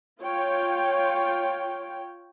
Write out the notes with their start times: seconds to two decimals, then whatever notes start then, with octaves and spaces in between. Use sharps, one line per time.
0.21 F4 C#5 G5